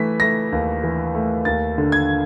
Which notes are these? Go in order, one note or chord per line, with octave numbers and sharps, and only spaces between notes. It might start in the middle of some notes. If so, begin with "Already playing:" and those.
Already playing: E3 A3 B6
A3 A#6
D#2
E3
A3
D#2 A6
D3
G#6